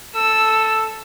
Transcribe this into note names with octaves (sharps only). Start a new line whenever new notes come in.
A4 E6